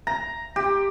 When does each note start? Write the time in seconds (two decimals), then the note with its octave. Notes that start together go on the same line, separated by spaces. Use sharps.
0.07 A#5
0.56 G4